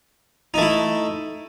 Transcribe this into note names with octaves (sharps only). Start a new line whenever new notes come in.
A3 D#4 E4